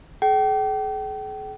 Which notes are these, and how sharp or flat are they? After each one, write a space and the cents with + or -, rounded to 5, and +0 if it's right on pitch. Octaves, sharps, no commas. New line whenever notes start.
G#4 +45 G5 -35